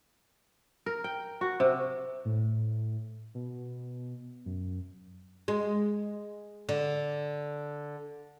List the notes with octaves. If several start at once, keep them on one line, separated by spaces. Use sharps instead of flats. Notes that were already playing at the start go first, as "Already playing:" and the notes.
A#4
G5
F#4
C3
A2
B2
F#2
G#3
D3